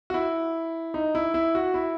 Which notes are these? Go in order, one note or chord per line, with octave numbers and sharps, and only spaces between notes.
F#4
E4
D#4
E4
E4
F#4
E4